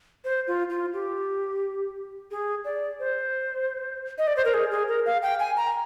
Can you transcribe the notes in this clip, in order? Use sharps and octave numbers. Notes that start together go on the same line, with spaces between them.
C5
F4
F4
G4
G#4
D5
C5
D#5
D5
C5
A#4
G#4
G#4
A#4
F5
G5
G#5
A#5